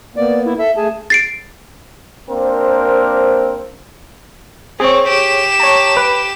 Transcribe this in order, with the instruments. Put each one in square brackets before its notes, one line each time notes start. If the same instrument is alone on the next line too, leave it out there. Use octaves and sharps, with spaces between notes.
[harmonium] A#3 B3 [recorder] D5
[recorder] E4
[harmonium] A4 [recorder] E5
[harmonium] A3 A5 [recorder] G#4
[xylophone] A6 C7 D7
[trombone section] A#3 C4 D4 A#4 C5
[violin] C4 [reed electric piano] G#4 C#5
[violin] G4 E7
[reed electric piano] C#5 A5 A#5
B4